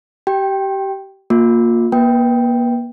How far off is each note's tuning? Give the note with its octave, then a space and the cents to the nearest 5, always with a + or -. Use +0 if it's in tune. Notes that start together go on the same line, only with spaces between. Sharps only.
G4 -25 G5 +0
A#3 +0 F4 +30 D6 +0
A#3 +40 B4 +0 G5 +0